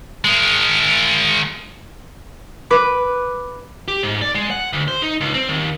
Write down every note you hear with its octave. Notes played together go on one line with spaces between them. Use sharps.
G#3 A#4
B4 D6
G4
G#2
D5
G#3
F#5
D2
C5
D#4
C#2
C4
D#2